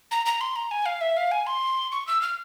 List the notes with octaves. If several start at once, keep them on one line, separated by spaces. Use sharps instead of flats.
A#5
A#5
C6
A#5
G#5
F5
E5
F5
G#5
C6
C#6
E6
F6